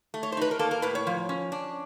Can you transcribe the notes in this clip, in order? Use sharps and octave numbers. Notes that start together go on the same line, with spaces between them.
A3
C#5
C5
D#4 B4
A#4
A#3 A4
A#4
A2 B4
C#5
F3
C#4
D4